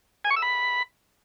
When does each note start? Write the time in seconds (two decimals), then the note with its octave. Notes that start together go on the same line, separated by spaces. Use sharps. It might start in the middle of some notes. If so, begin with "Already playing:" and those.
0.25 G#5
0.30 C#6
0.36 E6
0.42 B5